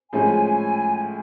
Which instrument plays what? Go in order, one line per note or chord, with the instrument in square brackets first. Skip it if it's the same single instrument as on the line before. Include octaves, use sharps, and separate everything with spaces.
[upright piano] A2 F3 G#3 C#4 [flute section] G#5